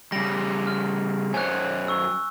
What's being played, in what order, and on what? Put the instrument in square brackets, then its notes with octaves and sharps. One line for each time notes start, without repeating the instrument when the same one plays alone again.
[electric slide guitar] C#3 G3 [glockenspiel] A#6
[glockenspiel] F6
[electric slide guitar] F#2 C5 C#5 [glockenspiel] G#5 F#6
[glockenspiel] C#6 E6